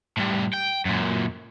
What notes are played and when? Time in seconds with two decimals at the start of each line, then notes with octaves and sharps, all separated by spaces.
0.17 A2 G3
0.54 G5
0.85 F#2 A#2